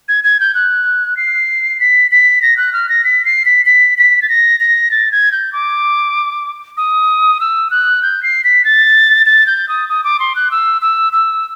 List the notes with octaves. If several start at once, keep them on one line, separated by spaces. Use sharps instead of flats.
G#6
G#6
G6
F#6
C7
B6
B6
A#6
F#6
F6
A#6
B6
C7
B6
B6
B6
A6
A#6
A#6
A6
G#6
G6
D6
D#6
E6
F#6
G6
C7
B6
A6
A6
G6
D#6
D#6
D6
C6
F#6
E6
E6
E6